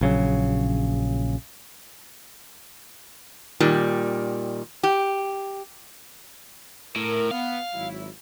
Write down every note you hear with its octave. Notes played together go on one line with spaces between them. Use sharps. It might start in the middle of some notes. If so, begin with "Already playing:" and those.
A#1 C#3 F#3
A#2 D#3 G3
G4
A2 A#4
B3 F5
G#1 F#3 E4